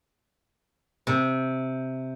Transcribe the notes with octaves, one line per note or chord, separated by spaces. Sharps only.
C3